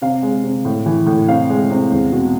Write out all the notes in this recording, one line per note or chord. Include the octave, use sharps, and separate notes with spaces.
C3 F5
G#3
C3
A2
E3
A2
C3 F5
G#3
C3
E2
B2